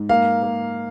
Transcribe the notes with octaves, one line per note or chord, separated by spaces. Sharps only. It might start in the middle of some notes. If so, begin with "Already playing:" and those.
Already playing: G#2
A#3 F5
A#3